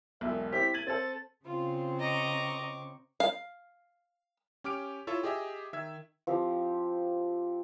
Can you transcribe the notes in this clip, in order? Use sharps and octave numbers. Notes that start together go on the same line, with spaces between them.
E1 B1 E5
C4 E4 G4 B6
G#6 A6 D#7 F#7
C4 A4 A6
C#3 C4 F4
D#5 A#5 C#6 D6
F5
C#4 G4 D6 F6 D7
E4 F4 A4 C#5 E5
G4 G#4 D#5 E5
D#3 E5 E6 G#6
F3 C4 G4